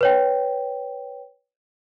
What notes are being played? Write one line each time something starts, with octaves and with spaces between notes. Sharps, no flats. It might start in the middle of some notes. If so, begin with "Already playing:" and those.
B4 C#5 G5